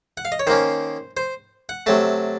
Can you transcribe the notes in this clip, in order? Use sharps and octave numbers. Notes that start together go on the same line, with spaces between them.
F#5
F5
D#5
C#5
D#3 A#3 C#4 C5
C5
F#5
C3 F#3 A3 A5